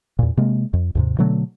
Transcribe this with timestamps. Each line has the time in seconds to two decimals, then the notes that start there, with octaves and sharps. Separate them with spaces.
0.19 E2 A#2
0.37 C3 G#3 A#3
0.73 F2
0.95 D#2 G#2 C3
1.18 B2 D3 F#3 A3